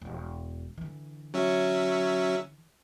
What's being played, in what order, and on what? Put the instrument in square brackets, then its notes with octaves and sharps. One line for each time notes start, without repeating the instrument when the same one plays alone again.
[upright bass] E1
D3 E3
[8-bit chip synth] F#3 C#4 E5